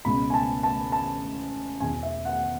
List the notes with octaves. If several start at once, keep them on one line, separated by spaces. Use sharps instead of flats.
C#2 B2 B5
G#5
A5
A5
A5
E2 B2 G#5
E5
F#5